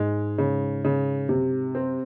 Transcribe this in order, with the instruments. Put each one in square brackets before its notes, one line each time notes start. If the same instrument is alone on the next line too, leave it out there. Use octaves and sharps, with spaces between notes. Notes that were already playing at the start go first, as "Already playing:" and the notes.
Already playing: [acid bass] G#2 [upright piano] G#3
[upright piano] C#3
C#3
[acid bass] F#2 [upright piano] C3
[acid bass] G#2
[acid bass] F#2 [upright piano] C4